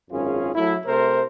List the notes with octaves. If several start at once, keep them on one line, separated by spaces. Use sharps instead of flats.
G#1 F#2 C#4 F4 G#4
F#3 A3 E4
C3 A3 A#4 C5